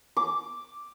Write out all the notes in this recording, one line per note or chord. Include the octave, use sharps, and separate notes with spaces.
D6